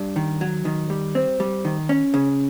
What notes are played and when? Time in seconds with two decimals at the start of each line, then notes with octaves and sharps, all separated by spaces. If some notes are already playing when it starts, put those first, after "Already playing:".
Already playing: G2
0.16 D#3
0.41 F#3
0.65 D#3
0.90 G3
1.15 C4
1.40 G3
1.65 D#3
1.89 C#4
2.14 C#3